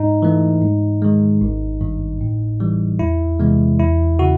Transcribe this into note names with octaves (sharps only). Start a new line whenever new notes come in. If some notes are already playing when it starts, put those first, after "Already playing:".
Already playing: G#2 D#4
E3 A3
G#2
D#3 G#3
G#1
G2 D#3
A2
E3 G3
E2 E4
C3 E3 G#3 B3
E2 E4
C#3 F#4